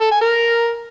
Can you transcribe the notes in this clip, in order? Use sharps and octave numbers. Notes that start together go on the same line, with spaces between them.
A4
G#5
A#4